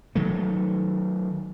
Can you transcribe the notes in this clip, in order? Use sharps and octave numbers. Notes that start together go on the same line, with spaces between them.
D#3 F#3 A3